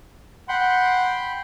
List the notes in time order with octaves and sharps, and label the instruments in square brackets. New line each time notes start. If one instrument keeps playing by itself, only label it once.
[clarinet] F#5 [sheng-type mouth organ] G5 B5 C6